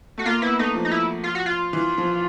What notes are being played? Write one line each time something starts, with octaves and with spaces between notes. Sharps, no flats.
A3 F#4
A#3 F4
B3 E4
A3 D#4
F3
D#4
E4
F4
F#4
F4
E3
F3